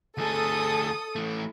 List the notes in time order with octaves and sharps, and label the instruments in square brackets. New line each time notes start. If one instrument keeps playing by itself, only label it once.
[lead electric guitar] D2 G#4 [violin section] A4 D#6
[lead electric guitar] E3 A3